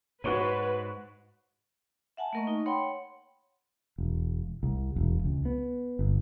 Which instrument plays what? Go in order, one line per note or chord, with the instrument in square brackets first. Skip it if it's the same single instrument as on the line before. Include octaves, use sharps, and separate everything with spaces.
[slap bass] G#2 [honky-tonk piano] F#4 C#6 D#7 [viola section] B4 [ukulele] C#5 F#5
[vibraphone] E5 F#5 G#5 A5
A3 A#3 A#4 D#5 C#6
D#4
C#5 F#5 G5 B5 C6
[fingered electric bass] E1
C2
E1
C#2
B3
G1